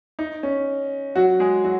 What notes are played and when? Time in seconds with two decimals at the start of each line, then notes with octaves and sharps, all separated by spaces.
0.19 D#4
0.43 C#4
1.15 F#3 F#4
1.40 G#3 G#4
1.64 F#3 F#4